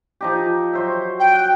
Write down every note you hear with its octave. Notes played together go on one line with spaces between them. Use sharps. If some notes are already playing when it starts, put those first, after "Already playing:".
F3 D#4 G4
F#3 C5 E5
G5
F#5